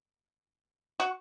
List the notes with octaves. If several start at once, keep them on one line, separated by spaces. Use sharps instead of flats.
F#4